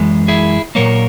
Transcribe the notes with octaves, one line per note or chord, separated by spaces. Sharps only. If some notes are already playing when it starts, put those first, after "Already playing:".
Already playing: F#2 E3 G#3
E4 G#4
A#2 F#3 A#3 A#4 C#5